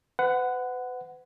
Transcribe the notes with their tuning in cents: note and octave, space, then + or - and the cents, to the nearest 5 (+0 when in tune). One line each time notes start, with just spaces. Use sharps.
B4 +40 F#5 +0